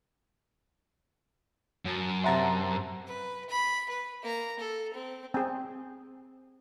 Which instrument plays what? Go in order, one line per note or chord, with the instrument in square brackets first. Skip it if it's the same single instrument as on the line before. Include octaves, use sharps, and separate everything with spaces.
[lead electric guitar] F#2 [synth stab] F#3 A5
[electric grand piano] C3 A#5 C6 [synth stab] E5 F#5 A5
[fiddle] B4
B5
B4
A#3 A#5
A4
C4
[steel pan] C4 G#4